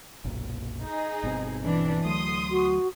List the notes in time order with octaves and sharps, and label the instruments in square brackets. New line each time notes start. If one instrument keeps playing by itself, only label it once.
[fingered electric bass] F#1 B1 A#2
[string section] D#4 G#4
[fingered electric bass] G1 B2 C4
[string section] E3 D4
[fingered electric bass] D2 F#3 A3 [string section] C6 D#6
[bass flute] F#4